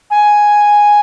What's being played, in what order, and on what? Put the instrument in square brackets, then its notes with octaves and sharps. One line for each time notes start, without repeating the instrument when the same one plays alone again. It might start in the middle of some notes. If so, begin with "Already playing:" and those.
[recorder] G#5